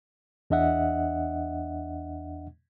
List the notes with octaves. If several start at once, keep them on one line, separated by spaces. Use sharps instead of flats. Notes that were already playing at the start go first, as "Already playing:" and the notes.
E2 D4 D#5 E5 F#5